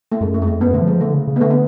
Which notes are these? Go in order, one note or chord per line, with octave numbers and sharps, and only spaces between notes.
A3
F#2 G#3
A3
F2 G#3
A3
F#2 B3
D3 A3
F3
G#3
D3 A3
C#3
C#3
B3
D3 A3
B3